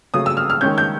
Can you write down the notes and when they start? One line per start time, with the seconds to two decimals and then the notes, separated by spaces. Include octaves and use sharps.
0.14 C#3 F#3 A3 D#6
0.26 E6
0.37 F6
0.50 F6
0.61 D#3 G#3 C#4 G6
0.78 G6